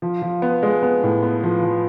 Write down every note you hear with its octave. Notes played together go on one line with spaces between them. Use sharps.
F3
F3
B3
G#3
B3
A2
B3
F3
F3